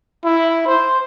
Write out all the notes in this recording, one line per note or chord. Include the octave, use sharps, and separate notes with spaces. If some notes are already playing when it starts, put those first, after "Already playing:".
E4
C5